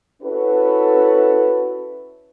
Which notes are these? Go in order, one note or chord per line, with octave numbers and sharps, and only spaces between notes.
C#4 E4 F#4 A4 B4